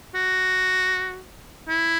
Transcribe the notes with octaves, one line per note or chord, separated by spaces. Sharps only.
F#4
E4